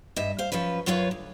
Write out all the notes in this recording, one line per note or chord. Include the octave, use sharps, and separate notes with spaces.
G2 D#5 E5
C5 F5
F3 F#3 C#4 B4
F#2 F#3 F4 B4 C#5 F5
D2